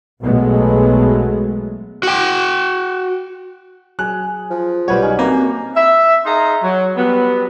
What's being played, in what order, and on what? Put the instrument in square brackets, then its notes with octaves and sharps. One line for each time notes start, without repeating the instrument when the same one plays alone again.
[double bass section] B1 B2 F#3 G#3 A3 B3
[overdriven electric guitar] F#4 G5
[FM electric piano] F#3 [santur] G#4 [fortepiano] F#6
[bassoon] F3
[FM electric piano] B1 F#3 F#4 [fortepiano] G3 B4 C#5
[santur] C#4 [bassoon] D#4
[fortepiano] A#3 [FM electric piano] C4 B4 [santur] F#4 G4
[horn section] E5
D#4 G#4 F5 A#5 C6
F#3
F#3 G3 B3